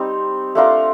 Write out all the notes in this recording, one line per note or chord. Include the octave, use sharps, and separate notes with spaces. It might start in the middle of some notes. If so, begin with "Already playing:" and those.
Already playing: G3 C4 D#4
A3 D4 F4 A#4